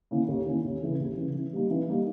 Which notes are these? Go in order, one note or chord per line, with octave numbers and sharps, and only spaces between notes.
D#3 A#3 C#4 E4
D#2
D#3 A#3 C#4 E4
D#2
C#3 E3
D#2
C#3 E3
E3
G3 A#3 D#4
E3
G3 A#3 D#4